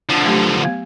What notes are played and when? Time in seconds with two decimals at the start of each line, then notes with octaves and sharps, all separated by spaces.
0.09 D3 F3
0.24 F#3 A3 G4
0.63 B3 F5